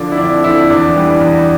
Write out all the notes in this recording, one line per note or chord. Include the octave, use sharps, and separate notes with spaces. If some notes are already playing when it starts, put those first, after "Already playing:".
Already playing: D3 F3 D4
E4
F2 D4
D3 F3 E4
E2 D4
E3 G3
E2